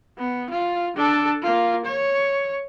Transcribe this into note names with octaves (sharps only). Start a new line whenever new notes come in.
B3
F4
D4 A4
A#3 F4
C#5